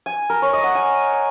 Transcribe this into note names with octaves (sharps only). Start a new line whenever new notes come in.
G#5
A#4
C#5
D#5
F#5
G#5